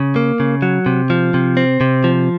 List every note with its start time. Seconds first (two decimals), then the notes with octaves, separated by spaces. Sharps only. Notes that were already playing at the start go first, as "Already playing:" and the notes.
Already playing: C#3
0.16 A#3
0.40 C#3
0.62 F#3
0.86 C3
1.10 F3
1.34 C3
1.57 C4
1.81 C3
2.04 F3